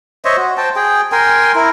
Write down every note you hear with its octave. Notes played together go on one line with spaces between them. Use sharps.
C5 C#5 D#5 E5
F#4
C5 G5 A5
G#4 G5
A#4 G5 G#5 C6
E4 A#4